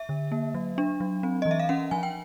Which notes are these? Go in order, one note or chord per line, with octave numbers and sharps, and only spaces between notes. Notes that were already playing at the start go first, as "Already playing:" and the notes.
Already playing: E5
D3
A#3
F#3
D4
F#3
C4
E3 D#5
E5
F5
C#4 F#5
F3 G#5
G5